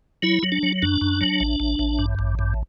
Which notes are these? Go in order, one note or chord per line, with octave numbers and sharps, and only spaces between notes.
F#3 E4
F#3
D4
F#3
F#2 D4
F#2
F#3
A1
A1
A1
G2
A1
G2